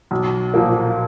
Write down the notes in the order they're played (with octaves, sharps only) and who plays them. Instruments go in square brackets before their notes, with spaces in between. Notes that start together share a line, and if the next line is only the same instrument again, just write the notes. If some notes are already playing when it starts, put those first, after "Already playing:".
[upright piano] B1
A#2 F3 A#3